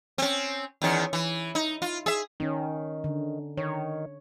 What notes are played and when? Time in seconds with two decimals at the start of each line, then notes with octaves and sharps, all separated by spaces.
0.18 C4 C#4
0.82 E2 D#3 C#4
1.13 E3
1.55 D#4
1.82 F4
2.06 G#4 E5
2.40 D#3 C#4 D#4
3.04 D3
3.57 D#3 C#5